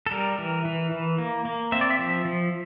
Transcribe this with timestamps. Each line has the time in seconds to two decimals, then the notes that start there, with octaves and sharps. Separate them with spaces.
0.06 A4
0.11 G3 A#4
0.38 E3
0.65 E3
0.92 E3
1.18 A#3
1.45 A#3
1.72 C4 E5
1.81 D5
1.90 E5
1.99 F3
2.25 F3